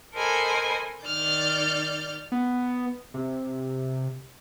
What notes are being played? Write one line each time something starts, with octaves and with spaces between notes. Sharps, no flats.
A4 A#4 C5 D#5 G#5 B5
D#3 D5 F6 G6
B3
C3